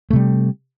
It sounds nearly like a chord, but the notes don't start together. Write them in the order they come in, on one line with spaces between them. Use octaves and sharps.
A3 C3 G3